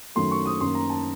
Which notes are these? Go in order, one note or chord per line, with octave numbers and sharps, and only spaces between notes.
F#2 D#3 F#3 A3 C6
C#6
D#6
F#2 D#3 A#3 C6
A#5
A5